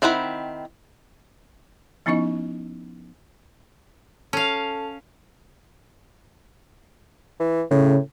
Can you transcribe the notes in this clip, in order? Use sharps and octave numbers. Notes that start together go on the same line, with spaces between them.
D#3 C4 E4 F#5 B5
F3 B3 C#4 D#4 E4 D#5
C#4 A4 F5 A5
E3
A2 C#3